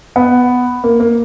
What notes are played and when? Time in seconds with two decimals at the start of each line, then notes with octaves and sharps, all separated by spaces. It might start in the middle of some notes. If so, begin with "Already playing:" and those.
0.16 B3
0.84 A#3
1.00 A#3